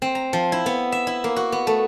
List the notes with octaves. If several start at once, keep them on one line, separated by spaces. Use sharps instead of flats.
C4
A#5
F3
E4
B3
E5
E4
A#3
F#4
B3
A3